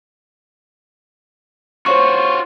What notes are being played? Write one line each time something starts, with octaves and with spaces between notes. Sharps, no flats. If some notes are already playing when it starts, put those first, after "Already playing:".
F4 F#4 C5 C#5 C#6